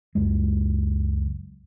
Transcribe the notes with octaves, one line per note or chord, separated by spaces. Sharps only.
C#2 F#2 G#3